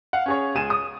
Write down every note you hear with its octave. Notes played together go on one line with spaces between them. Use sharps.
F5 F#5
C#4 G#4 C#5
C#2 G#4 D#7 E7
D#6